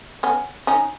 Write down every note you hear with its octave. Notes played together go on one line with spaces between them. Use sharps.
B3 C#4
C#4 D#4